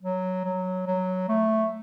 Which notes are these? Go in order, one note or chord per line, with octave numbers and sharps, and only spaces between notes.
F#3
F#3
F#3
A3